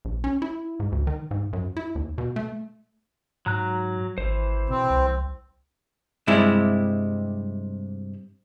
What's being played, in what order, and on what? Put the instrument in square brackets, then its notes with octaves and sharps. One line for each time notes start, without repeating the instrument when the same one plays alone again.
[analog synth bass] A#1
C#4
E4
G#2
D2
D#3
G#2
F#2
E4
D#2
B2
A3
[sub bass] G#2 [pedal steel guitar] F#3 A#5 F#6
[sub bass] G#1 [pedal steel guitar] E3 C5
[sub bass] B2 [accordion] C4
[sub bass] C2
[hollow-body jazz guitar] G2 C3 G3 G#3 E4